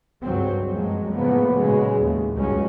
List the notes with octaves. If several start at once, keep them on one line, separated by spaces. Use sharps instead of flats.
C#2 G2 F#3 C4
F#2 A#2 F3 F#3 G#3
A2 C#3 F3 A#3 B3
A#2 C#3 F#3 G#3
D#2 A2
C#2 G2 F#3 G#3 C#4